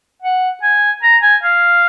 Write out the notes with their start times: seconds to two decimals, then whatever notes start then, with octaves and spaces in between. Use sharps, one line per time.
0.22 F#5
0.63 G#5
1.03 A#5
1.22 G#5
1.43 F5